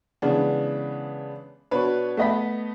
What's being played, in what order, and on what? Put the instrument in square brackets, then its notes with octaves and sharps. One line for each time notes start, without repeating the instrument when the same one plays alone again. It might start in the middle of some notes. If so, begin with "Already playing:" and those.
[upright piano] C#3 E3 G#3 B3 D4
B2 D4 B4 C#5 B5
A3 B3 D#5 B5 B6